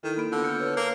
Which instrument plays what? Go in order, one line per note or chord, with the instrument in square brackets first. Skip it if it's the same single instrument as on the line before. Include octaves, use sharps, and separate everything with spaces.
[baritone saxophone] D#3 [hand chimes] E4 A4
[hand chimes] A#3 B5 D7
[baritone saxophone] D3 [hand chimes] B3 F4
[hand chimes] F6 G6 C#7
B4 C#5
[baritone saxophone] A#3